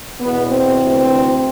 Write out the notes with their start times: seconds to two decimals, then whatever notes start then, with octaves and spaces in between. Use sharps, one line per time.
0.21 E2 B2 B3
0.48 C4
0.77 D2 C3 E3